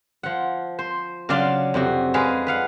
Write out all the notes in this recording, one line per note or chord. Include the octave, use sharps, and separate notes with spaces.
F3 F#5
C5
C#3 F#3 D4 D5 F5 C6
F2 C3 F#4
G#3 G#4 B4 F5
B4 F5 F#5